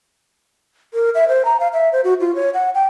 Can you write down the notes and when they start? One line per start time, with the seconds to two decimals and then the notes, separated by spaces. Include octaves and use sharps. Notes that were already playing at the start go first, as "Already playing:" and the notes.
0.94 A#4
1.15 E5
1.28 C5
1.45 A#5
1.60 F5
1.73 E5
1.93 C5
2.04 F#4
2.20 F4
2.35 C#5
2.54 F#5
2.75 G5